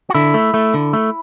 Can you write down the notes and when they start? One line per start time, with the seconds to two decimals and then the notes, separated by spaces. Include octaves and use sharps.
0.10 F#4
0.15 D3 E4
0.34 A3
0.54 A3
0.74 D3
0.93 A3